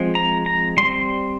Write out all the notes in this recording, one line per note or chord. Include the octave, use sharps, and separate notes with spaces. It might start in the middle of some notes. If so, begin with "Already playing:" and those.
Already playing: F3 G#3 C4
A#5
A#5
G3 C4 C6